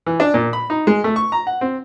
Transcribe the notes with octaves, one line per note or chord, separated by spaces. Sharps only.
E3
D4
A#2
B5
D#4
G#3
A3
C#6
A#5
F#5
C4